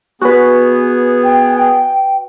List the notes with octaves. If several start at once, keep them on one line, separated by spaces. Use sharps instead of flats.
B3 F#4 G#4 B4
G5